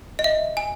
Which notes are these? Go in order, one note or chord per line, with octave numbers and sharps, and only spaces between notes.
D#5
E5
G#5